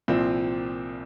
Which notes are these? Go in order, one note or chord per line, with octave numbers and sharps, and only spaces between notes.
C2 A#2 F3 C4